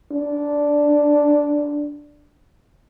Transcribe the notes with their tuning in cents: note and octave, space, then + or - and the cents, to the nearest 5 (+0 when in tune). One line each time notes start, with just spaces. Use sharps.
D4 -5